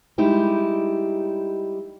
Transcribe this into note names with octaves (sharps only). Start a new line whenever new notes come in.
G3 G#3 D#4 E4 G4 G#4